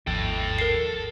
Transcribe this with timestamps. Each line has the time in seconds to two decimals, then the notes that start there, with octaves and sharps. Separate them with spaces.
0.07 G#1 D#2 F3 A4 G5
0.59 A#4 C7